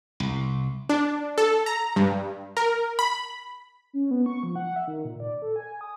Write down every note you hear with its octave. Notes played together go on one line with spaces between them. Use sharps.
C2
D4
A4
A#5
G2
A#4
B5
C#4
B3
C#6
F3
F#5
E5
D#3
A#2
D5
A4
G#5
D#6